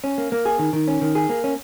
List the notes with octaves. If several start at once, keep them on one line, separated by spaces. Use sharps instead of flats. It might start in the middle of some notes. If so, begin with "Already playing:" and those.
C#4
A#3
A#3
G#4
D#3
D#3
C#4
D#3
G#4
A#3
C#4